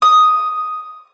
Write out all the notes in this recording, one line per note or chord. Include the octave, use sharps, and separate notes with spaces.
D#6